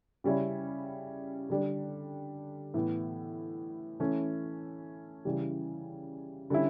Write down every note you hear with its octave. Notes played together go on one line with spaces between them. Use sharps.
C#3 G3 C#4 E4
D3 G3 D4
A2 E3 B3
E3 A3 C#4
C#3 E3 G3
D3 G3 C#4 E4